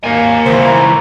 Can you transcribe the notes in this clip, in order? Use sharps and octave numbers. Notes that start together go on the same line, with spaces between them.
D#2 A#3 A#4 G#5
C#2 E3 C5
A#5